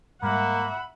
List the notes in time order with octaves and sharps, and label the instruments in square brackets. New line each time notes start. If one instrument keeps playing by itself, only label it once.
[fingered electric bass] G#2 G3 [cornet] A#3 [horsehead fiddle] E5 F#5 [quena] B5